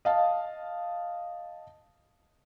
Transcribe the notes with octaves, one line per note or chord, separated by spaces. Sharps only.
D#5 F5 A5